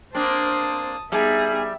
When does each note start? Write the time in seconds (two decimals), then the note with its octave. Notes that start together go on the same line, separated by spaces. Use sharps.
0.15 A#3 C4 D4 C5 A5 D#6
1.12 G3 B3 D#4 G#4 E5